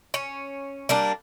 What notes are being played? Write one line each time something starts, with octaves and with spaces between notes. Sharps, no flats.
C#4
G3 A#3 D4